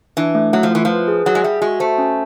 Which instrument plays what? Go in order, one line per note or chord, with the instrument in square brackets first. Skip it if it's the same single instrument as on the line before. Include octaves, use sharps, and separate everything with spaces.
[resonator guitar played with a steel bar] E3 [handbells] D4
[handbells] A3
[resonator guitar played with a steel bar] F#3 [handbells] A3
[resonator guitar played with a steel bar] F3
[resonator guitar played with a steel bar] E3 [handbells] F4
[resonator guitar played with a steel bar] F3 [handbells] B4
[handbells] G#4
[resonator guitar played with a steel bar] F#3 [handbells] G#4
[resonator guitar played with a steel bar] G#3
[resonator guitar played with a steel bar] G3 [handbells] E5
[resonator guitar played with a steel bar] G#3 [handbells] F#4
[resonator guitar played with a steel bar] A3 [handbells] C5
[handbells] C#4